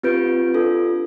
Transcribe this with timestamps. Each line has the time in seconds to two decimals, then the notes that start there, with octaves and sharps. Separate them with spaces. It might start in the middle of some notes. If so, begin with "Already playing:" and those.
0.03 C4 F4 G4 B4 G6 D7
0.54 D4 F4 A4